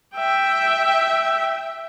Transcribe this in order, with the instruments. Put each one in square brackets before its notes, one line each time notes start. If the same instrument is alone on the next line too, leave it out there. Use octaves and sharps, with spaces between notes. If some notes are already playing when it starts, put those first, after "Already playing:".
[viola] E5 G5